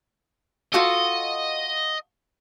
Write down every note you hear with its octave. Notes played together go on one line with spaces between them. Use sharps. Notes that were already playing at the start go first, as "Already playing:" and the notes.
F4 F#4 A4 D#5